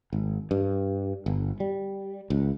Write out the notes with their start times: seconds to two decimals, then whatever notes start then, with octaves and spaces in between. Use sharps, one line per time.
0.13 G#1
0.51 G2
1.26 G1
1.60 G3
2.30 C#2